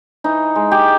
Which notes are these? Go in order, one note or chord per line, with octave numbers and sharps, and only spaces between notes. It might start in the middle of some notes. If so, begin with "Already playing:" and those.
E3 D#4
G#3
G4